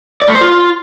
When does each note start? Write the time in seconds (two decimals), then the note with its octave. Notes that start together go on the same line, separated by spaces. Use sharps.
0.22 D5
0.28 A3
0.35 C5
0.41 F4